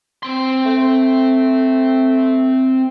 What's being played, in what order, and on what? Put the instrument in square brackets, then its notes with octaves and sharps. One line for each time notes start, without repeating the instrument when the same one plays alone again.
[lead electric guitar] C4 C6
[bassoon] A3